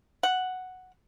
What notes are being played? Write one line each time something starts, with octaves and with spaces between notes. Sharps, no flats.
F#5